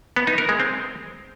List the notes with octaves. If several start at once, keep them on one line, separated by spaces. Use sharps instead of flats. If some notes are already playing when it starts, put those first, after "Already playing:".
B3
D#4
A#4
G#3
C4